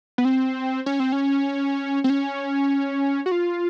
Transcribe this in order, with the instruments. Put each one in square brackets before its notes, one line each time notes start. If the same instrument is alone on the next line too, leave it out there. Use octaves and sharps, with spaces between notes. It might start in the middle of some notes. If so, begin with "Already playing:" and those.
[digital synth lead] B3
C4
C#4
C4
C#4
C4
C#4
F#4
F4